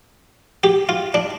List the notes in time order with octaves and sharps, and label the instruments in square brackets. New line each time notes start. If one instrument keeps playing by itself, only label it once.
[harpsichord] G4
F4
D4